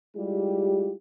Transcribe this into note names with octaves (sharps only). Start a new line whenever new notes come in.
G3 G#3 E4 F4 G4